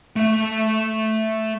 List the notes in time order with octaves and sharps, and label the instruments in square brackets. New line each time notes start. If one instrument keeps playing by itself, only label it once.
[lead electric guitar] A3 E5